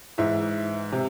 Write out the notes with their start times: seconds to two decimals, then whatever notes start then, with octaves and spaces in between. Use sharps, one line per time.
0.18 G#2 E3 E5
0.92 C3